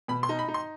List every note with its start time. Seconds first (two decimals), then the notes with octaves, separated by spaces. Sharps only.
0.08 B2 B5
0.23 C6
0.29 D#4
0.39 B5
0.48 D#4
0.54 C6